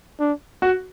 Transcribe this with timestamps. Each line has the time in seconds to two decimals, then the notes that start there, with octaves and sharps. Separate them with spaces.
0.20 D4
0.62 F#4